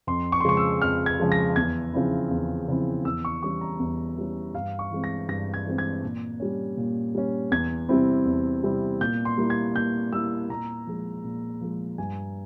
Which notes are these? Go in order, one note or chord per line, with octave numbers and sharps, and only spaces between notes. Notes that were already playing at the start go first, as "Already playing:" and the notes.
F2 C6
C#6
C6
C#3 F3 G#3 C#6
E6
F2 F6
G#6
C#3 F3 G#3
A#6
E2 G#6
C#3 F3 C4 E4
E2
C#3 F3 C4 E4
E2 E6
C#6
E3 G3 C#4 C#6
A#5
E2
E3 G3 C#4
G2 F5
C#6
E3 G#3 C4
A#6
G2 A#6
G#6
E3 G#3 C4
G#6
A#2
G3 C#4
A#2
G3 C#4
E2 G#6
C3 G3 C4 E4
E2
C3 G3 C4 E4
A#2 G6
C6
G3 A#3 E4
G#6
A#2 G6
G3 A#3 E4 E6
A#2 A#5
F3 G#3
A#2
F3 G#3
G2 G#5